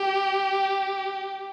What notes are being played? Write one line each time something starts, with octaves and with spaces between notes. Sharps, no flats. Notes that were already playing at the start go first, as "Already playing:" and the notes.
Already playing: G4